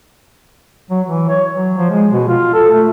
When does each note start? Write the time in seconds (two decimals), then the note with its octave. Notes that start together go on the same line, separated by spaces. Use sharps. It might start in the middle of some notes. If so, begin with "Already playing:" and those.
0.90 F#3
1.06 E3
1.29 C#5
1.54 F#3
1.78 F3
1.90 G#3
2.12 B2
2.29 F4
2.53 A4
2.71 A3